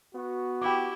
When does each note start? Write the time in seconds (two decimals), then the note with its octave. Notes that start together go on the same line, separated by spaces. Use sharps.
0.14 B3 F#4
0.62 E4 G4 G5 D6